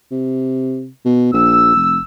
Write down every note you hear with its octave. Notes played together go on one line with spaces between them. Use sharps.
C3
B2
A#1 E6
F1